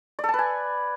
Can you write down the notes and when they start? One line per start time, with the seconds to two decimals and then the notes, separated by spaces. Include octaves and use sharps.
0.19 D5
0.24 A4
0.29 A5
0.34 B4
0.39 G#5